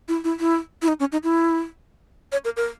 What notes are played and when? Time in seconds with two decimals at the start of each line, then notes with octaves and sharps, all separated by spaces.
0.08 E4
0.24 E4
0.40 E4
0.82 E4
0.88 D#4
1.00 C#4
1.12 D#4
1.24 E4
2.32 C#5
2.45 A#4
2.57 A#4